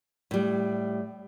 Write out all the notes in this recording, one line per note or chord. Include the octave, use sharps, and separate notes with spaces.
A2 G3